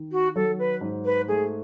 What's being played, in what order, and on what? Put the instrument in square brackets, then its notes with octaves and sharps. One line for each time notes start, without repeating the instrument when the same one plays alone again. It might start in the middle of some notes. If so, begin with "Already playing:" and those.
Already playing: [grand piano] D#3
[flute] F#4
[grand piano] F#3 [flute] A4
[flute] B4
[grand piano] G#2
[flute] B4
[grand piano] A3 [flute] G#4